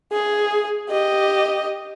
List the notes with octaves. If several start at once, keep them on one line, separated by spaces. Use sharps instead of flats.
G#4
G4 D#5